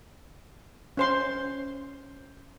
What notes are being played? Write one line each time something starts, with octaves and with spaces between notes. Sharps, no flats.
C#4 C5 C6